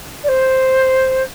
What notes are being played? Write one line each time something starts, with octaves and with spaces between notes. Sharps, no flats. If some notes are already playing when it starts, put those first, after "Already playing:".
D5
C5